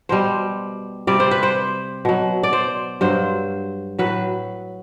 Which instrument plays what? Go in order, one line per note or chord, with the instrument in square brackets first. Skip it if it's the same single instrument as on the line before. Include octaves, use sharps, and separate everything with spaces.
[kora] B2 G3 C5
C3 G3 D5
C5
B4
C5
B2 F#3
D5
C5
G2 F#3 C5
A2 F#3 B4